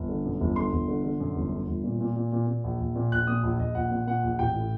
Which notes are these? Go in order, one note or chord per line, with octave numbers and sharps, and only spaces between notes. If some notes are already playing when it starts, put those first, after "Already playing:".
Already playing: G1
D3
F#2
G1
D3 C6
G1
D3
D3
F#2
G1
D3
G1
A#2
A#2
A#2
A#2
A#2
A#1
A#1
A#2
A#1 F#6
A#2 D#6
A#1
A#1 D#5
A#1 F#5
A#2
A#2 F#5
A#1
A1 G5
A2